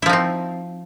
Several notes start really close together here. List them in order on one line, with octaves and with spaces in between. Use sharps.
E4 F3 D#4 C4